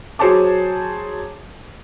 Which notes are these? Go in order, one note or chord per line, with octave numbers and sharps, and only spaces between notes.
F#3 G#4 C5 C#5 A5 D6